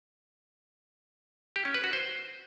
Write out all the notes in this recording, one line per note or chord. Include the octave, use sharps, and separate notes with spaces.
G4
C#4
B4
F#4
C5